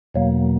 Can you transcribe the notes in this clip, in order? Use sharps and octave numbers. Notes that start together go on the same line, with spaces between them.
E2 B2 F#3 A#3